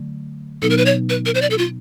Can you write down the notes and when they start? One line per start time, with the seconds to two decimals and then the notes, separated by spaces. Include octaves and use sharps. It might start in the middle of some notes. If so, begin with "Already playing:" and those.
Already playing: D3 F#3 A3
0.62 B2 F#3 B3 D#4 A4
0.70 A#4
0.78 B4
0.86 C#5
1.09 B4
1.26 A#4
1.35 C5
1.42 D5
1.50 A4
1.58 F4